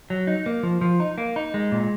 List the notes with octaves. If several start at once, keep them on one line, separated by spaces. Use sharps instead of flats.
F#3
D#4
A#3
F3
F3
D#4
A#3
D#4
G#3
A#2